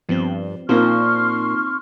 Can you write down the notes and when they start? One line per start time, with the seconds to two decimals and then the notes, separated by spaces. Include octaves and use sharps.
0.09 G2 F3 B3 C4
0.69 A#2 F3 A#3 C4 D#4 C6 C#6 F6